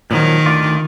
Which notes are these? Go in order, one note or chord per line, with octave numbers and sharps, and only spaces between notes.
A#2 D#3 F3 F#3
D2 F4 D5